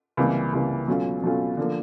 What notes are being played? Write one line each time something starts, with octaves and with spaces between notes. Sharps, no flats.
C#2 C3 E3 G3 A#3
C#2 C3 E3 G3 A#3
B2 F#3 A3 C#4 F4
B2 F#3 A3 C#4 F4
D3 F3 A#3